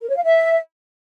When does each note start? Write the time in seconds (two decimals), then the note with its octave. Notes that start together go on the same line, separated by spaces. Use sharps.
0.02 A#4
0.09 C#5
0.17 F5
0.24 E5